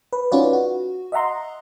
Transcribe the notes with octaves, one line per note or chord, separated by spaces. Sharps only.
B4
C#4 D#4 F4 F#4 B4 D5
F#4
D#5 E5 F#5 A#5 C6